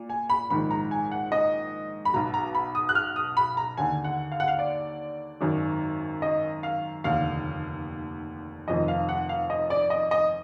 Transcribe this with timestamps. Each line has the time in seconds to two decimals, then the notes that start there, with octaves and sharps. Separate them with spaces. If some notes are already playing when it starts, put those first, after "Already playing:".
Already playing: A#2
0.10 G#5
0.30 B5
0.50 A#1 G#2 D#3 B5
0.71 A#5
0.91 G#5
1.11 F#5
1.32 D#5
2.05 B5
2.13 B1 B2 A#5
2.34 A#5
2.55 B5
2.75 D#6
2.89 F#6
2.95 F6
3.16 D#6
3.37 B5
3.57 A#5
3.77 D#2 D3 G#5
4.04 F#5
4.32 F5
4.40 F#5
4.48 F5
4.59 D5
5.41 G#1 F#2 D#3
6.22 D#5
6.63 F5
7.04 F1 D#2 D3 F5
8.68 F1 F2 D#3 D#5
8.88 F5
9.09 F#5
9.29 F5
9.50 D#5
9.70 D5
9.90 D#5
10.11 D#5